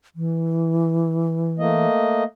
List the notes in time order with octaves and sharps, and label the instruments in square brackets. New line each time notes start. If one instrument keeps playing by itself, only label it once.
[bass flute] E3
[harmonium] A3 A#3 D#5